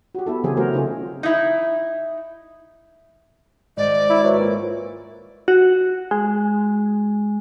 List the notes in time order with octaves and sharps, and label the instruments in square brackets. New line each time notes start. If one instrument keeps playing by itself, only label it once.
[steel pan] F#4 G4
B3 E4 A4
C#3 E3 F#3 C4 G4 G#4
A3 F#4 A#4 C5
C#3 C4 D#4 F4 G#4
[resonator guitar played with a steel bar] D#4 E4
[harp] G#1 [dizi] D5 [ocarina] D#5
[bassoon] E4 [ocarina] C5
[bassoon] F#3 [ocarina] B4 [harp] C#5 F5
[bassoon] A#2 [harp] C4 C#6 D7
[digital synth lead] F#4
G#3